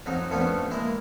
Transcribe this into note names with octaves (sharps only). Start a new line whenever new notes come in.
F2 F#3 D#4
F2 D3 F3 A3 B3 C#4
G#3 A#3 E4